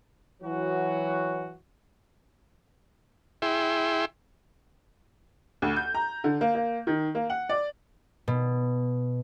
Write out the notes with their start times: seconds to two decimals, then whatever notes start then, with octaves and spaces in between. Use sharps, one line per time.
0.43 E3 F#3 F#4
3.42 E4 G#4 E5 G5 C6
5.62 D2
5.76 G6
5.94 A#5
6.24 D3
6.41 A#3
6.55 A#3
6.87 D#3
7.15 A#3
7.30 F#5
7.49 D5
8.28 B2